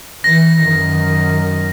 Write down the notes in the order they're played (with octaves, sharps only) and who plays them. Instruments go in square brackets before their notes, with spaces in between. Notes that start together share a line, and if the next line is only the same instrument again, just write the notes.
[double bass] E3 [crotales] A#6
[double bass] F#2 D#3